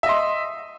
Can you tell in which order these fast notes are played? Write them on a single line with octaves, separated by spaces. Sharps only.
E5 D#5 C6